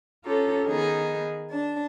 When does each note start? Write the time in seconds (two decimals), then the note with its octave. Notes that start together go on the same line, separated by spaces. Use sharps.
0.24 C#4 F4 G4 A4 C#5 A#5
0.67 D#3 B3 D#4 G#4
1.51 D4 A5